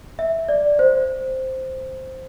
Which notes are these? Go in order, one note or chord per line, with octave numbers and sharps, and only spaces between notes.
E5
D5
C5